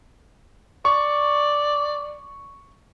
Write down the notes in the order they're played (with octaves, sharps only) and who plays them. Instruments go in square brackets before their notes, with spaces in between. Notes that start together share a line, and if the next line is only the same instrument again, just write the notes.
[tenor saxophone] D5 [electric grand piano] C#6